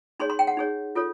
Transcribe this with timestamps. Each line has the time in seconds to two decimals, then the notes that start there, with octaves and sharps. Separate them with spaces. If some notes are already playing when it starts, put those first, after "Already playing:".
0.20 D#4 G#4 C#5 C6
0.30 C6
0.39 G5
0.47 F#5
0.57 D#4 G#4 C#5
0.95 F4 A4 C#5